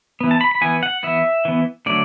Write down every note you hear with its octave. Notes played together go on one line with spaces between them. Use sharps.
E3 B3
A5
B5
B5
E3 B3 G#5
F#5
E3 B3 E5
E3 B3
D3 F#3 A3 D5